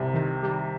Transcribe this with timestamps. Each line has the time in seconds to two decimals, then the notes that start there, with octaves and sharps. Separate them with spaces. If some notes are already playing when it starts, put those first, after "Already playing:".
Already playing: C2 C3 G3
0.14 D#3
0.43 G3